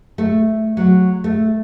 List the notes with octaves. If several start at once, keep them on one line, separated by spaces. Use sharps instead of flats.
A3
F#3
A3